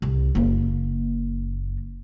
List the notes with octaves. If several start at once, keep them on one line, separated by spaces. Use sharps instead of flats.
C2
F#1 A#3